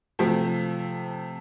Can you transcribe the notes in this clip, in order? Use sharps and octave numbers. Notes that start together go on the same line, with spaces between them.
C3 F3 A3